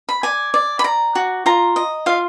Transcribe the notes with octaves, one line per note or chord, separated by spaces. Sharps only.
B5
D5 G#5
D5
B5
D5 A#5
F#4
F4 A#5
D#5
F4 F5